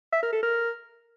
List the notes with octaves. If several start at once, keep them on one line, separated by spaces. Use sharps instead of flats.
E5
A#4
A4
A#4